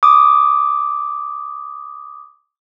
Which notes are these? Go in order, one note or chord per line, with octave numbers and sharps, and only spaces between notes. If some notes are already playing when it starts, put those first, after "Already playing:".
D6 D#6